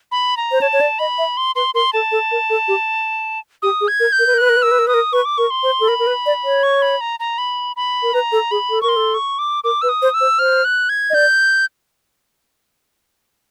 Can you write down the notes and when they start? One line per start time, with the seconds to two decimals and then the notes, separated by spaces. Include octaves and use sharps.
0.12 B5
0.37 A#5
0.52 C5
0.61 C#5 A5
0.73 C#5
0.81 D5
0.99 D#5 B5
1.18 E5
1.37 C6
1.56 B4 C6
1.74 A#4 C6
1.93 A4 A5
2.12 A4
2.31 A#4
2.50 A4
2.68 G4
3.62 G4 D#6
3.81 G#4
3.88 G#6
4.00 A#4
4.12 G6
4.19 A#4
4.27 B4
4.34 A#4
4.38 B4 F#6
4.49 A#4
4.57 B4
4.62 A#4 E6
4.71 B4
4.79 A#4
4.87 B4 D#6
4.94 A#4
5.13 B4 C#6
5.25 D6
5.38 A#4 C#6
5.50 C6
5.63 C5
5.80 A4
5.88 A#4 B5
5.99 A#4
6.07 B4
6.26 D5
6.44 C#5
6.63 C#6
6.82 B5
7.01 A#5
7.20 A#5
7.38 B5
7.76 B5
8.03 A#4
8.14 B4 A#5
8.32 A4
8.51 G#4 B5
8.70 A4
8.81 A#4 C#6
8.89 C6
8.96 A4
9.14 C#6
9.39 D6
9.64 A#4 D6
9.82 B4 E6
9.89 D#6
10.02 C5
10.14 E6
10.21 C5
10.39 C5 F6
10.65 F#6
10.89 G#6
11.10 D#5
11.14 D5 G6